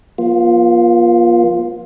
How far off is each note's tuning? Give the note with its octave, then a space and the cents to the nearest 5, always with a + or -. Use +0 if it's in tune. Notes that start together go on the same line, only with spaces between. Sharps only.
F3 +0 A#3 +40 F4 +0